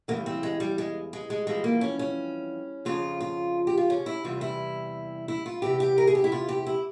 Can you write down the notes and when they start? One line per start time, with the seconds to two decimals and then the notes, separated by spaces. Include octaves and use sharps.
0.08 E2 C#3 E3 G3 A#3
0.26 C4
0.43 G#3
0.60 G3
0.78 G#3
1.13 G#3
1.30 G#3
1.47 F2 E3 G3 G#3
1.64 A#3
1.81 C#4
1.99 C#4
2.85 F2 C#3 F3 F4
3.21 F4
3.67 G4
3.77 F4
3.90 C#4
4.06 E4
4.23 E2 C3 E3 G3 F4
4.41 E4
5.28 E4
5.46 F4
5.62 E2 C3 E3 G4
5.80 G4
5.98 A#4
6.07 G#4
6.15 G4
6.24 E4
6.32 F4
6.49 G4
6.67 E4